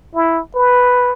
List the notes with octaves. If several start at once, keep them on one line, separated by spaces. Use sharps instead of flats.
E4
B4